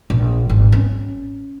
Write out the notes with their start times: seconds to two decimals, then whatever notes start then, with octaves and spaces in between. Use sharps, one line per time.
0.10 A#1
0.49 G#1
0.72 C#4